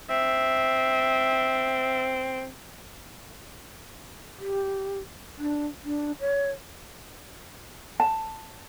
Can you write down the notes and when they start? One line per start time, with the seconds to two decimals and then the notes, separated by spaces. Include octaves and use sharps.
0.10 C4 E5
4.39 G4
5.38 D4
5.85 D4
6.20 C#5
8.00 A5